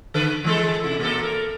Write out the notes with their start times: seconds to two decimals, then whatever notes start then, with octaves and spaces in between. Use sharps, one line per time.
0.14 D3 A4 B4
0.44 E3 G#3 A4
0.83 C3 E4
1.00 A#2 A#3 A4
1.23 A#4